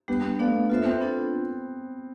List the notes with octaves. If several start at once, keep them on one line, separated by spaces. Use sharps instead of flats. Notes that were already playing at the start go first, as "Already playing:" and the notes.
G3 B3 D4 G4
A3 B3 D4 A4 D5 F5
B3 F4 A4 C5 E5
C4
B3 D4 F4 A4